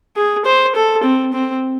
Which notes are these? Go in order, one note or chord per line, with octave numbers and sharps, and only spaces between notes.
G#4
C5
A4
C4
C4